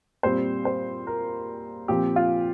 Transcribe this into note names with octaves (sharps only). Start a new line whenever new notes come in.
A#2 G3 C4 C5
C5
A#4
A#2 F3 C4 G4
F4